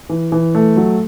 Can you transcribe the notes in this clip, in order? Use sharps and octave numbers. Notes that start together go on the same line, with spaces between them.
E3
E3
A3
F#3